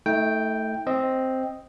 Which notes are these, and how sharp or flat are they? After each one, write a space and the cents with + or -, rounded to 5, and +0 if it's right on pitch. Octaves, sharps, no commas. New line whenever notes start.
A3 +0 D#4 +45 G5 +0
C4 +0 D#5 +0